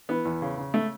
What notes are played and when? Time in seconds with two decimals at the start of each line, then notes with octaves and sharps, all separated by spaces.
0.09 E3 B3
0.25 E2
0.42 C#3
0.58 C#3
0.74 A3